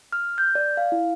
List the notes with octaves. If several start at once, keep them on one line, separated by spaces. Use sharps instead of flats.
F6
G6
D5
F5
E4